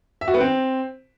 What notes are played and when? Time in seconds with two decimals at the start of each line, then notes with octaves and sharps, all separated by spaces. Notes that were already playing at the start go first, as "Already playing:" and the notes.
0.21 E5
0.28 F#4
0.34 B3
0.40 C4